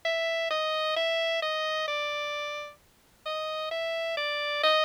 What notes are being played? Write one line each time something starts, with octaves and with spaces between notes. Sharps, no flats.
E5
D#5
E5
D#5
D5
D#5
E5
D5
D#5